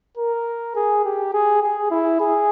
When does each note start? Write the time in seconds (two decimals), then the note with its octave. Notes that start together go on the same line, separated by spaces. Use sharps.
0.18 A#4
0.76 G#4
1.05 G4
1.34 G#4
1.62 G#4
1.91 E4
2.20 G#4